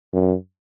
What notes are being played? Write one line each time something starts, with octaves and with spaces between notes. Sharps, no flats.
F#2